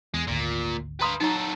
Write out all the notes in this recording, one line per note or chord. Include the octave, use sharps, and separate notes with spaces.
E2 G#3
G#1 D2 A#2
B4 F5 A#5 C6 D#6
F#3 D#4 A4 A#5